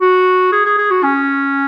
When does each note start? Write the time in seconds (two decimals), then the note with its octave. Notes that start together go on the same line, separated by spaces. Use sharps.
0.01 F#4
0.52 G#4
0.65 G#4
0.78 G#4
0.91 F#4
1.03 C#4